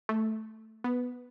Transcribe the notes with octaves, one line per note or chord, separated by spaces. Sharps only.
A3
B3